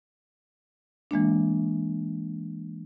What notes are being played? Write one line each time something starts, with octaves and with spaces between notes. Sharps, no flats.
E3 G#3 A#3 D4